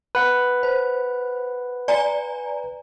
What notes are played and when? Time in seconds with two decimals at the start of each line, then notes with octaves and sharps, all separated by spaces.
0.15 B4 F#5
0.63 C5
1.88 D5 G#5 A#5